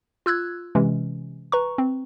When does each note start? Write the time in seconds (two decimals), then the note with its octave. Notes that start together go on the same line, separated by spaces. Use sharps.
0.26 F4 E6 F#6 G#6
0.75 C3 E3 G#3 C#4
1.52 B4 A#5 C#6
1.78 C4